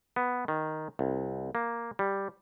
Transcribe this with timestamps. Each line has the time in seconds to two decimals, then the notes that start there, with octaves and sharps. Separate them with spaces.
0.16 B3
0.48 D#3
0.99 C2
1.55 A#3
1.99 G3